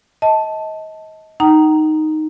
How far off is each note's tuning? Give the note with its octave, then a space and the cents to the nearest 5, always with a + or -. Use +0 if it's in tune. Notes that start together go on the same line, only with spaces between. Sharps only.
D#5 +30 A5 +0
D#4 +0 G5 -45 A#5 +0